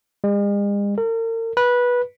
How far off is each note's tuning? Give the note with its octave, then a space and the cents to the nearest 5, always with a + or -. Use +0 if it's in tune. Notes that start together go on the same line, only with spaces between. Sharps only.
G#3 -45
A#4 -40
B4 -15